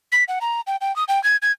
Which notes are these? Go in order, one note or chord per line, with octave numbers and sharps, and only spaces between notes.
B6
F#5
A#5
G5
G5
D#6
G5
G#6
G#6